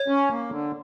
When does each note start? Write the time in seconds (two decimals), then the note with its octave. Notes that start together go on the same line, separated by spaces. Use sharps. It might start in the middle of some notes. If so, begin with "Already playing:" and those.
Already playing: C#5
0.08 C#4
0.30 A#3
0.51 D3